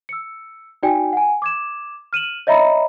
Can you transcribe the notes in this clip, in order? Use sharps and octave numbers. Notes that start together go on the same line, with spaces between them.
E6 C#7
D#4 F#4 D5 G5 G#5
F#5 G#5
D6 G#6 E7
F6 D#7 E7 F#7
C#5 D#5 E5 A#5 B5